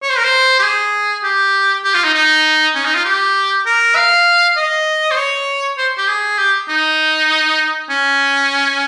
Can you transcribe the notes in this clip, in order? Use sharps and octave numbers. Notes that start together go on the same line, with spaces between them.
C#5
C5
A#4
C5
G4
G#4
G4
G4
F4
D#4
D#4
C#4
D#4
F4
G4
A#4
F5
D#5
C5
C#5
C5
G4
G#4
G4
D#4
C#4